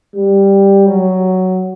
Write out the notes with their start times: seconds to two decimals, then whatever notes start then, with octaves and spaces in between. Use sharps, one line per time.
0.15 G3
0.86 F#3